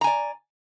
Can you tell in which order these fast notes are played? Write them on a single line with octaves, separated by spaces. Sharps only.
A#5 G#5 D5